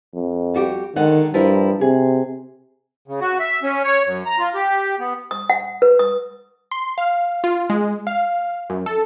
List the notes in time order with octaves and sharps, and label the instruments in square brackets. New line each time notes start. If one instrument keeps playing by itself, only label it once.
[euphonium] F2
[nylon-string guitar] G3 F#4 G4
[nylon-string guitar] D3 G#3 F#5 [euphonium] D#3
[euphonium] G2 [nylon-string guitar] F3 E4 A#4
[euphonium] C3 [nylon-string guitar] G#4
[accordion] C#3
F#4
E5
C#4
C#5
F#2
A#5
F4
G4
B3
[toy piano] D#6
F#5
B4
D#6
[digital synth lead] C6
F5
F4
G#3
F5
F#2
A4